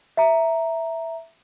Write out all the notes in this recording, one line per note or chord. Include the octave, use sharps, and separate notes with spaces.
E5 A#5